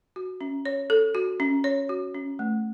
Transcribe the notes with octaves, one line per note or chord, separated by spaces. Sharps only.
F#4
C#4
C#5
A4
F#4
C#4
C#5
F#4
C#4
A3